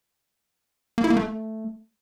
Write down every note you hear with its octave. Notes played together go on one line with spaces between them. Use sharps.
A#3
E4
A#3
A3